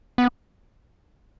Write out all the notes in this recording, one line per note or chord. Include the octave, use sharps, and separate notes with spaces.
B3